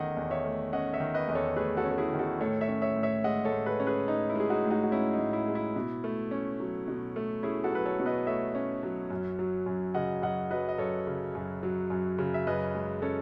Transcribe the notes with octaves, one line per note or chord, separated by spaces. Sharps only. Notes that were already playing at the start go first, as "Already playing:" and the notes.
Already playing: E2 D#3 A3 C#4 C#5 D#5 F#5
E2
C#5 E5
A3
C#4 D#5 F#5
C#5 E5
D#3
B4 D#5
E2 D#5
A4 C#5
A3 G#4 B4
F#4 A4
C#4
A4
E4 G#4
D#3
F#4 A4
A2 A4 C#5
C#5 E5
C#4
C#5 E5
A2
C#5 E5
G#3 D#5 F#5
A4 C#5
A2
G#4 B4
C#4
G#4 B4
A2 D#4
E4
G#3 G#4
D#4 F#4
A2
D#4 F#4
F#4
C#4 E4
D#4
A2
E4
G#3
E4
B2
A3
C#4
F#3
B2
A3
C#4 E4 G#4
F#4 A4
F#3 B4
A4 C#5
B2
B4 D#5
A3 C#5 E5
C#4
F#3
F#2
F#3
F#2
C#3 D#5 F#5
F#2 D#5 F#5
F#3 B4 D#5
D#5
F#2 A4 C#5
C#3
F#2
F#3
F#2
C#3
E5
F#2 B4 D#5
G#3
C#4 A4 C#5